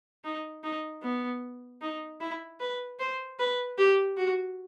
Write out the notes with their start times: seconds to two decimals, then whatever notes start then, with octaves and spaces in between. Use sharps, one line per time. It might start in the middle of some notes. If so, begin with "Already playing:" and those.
0.25 D#4
0.64 D#4
1.03 B3
1.82 D#4
2.20 E4
2.60 B4
2.99 C5
3.39 B4
3.78 G4
4.17 F#4